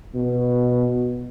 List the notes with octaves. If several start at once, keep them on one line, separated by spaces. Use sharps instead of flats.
B2